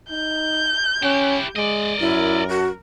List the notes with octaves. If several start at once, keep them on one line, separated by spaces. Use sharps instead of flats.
D#4 G6
C#4 E4 G4
G#3 D5 D#5
F#2 E4 A#4
F#4